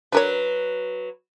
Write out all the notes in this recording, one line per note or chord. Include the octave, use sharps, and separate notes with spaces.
F#3 D4 A#4 B4 C#5